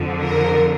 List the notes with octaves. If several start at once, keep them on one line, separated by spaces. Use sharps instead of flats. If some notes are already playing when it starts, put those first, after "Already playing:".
Already playing: F2 D3 F3
A#4